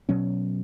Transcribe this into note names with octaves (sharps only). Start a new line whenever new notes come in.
B2 F#3 C#4